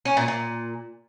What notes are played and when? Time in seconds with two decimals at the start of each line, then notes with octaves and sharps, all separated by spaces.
0.05 C#4
0.17 A#2
0.28 A#2